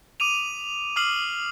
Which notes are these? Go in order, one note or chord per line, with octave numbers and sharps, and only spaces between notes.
D6 D#6 D#7 F7
D6 D#6 F6 C7 F#7